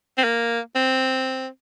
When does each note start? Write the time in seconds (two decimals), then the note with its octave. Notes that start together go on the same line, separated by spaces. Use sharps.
0.18 C4
0.24 A#3
0.75 C4